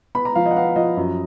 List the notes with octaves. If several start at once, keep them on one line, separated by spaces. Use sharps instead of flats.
B3 B5
A#5
F3 F5
D#5
F#5
B3 F5
F3 D#5
F#2